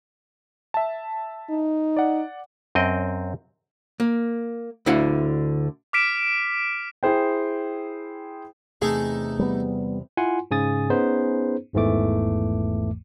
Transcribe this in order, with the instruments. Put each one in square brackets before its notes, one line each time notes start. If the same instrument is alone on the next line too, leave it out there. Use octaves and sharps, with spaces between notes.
[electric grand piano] E5 A5
[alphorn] D#4
[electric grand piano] D5 F#5
[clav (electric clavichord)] F#2 C4 D#5 G5
[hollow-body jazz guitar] A#3
D2 D3 E4 F5 F#5
[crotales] D6 F6 B6 D7 E7
[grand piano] E4 G#4 C5 G5
[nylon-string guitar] E2 C3 [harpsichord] A3 D#4 A4 [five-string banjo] G#4
[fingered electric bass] G3 B3
[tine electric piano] E4 F4 F#5 G#5 C6
G#2 C#3 G#5 D#6 A6
B3 C#4 D#4 G#4 B4 C5
G#1 E2 G#2 E3 A3 D6